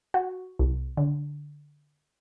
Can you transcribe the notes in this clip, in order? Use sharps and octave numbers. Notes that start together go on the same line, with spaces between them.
F#4
C2
D3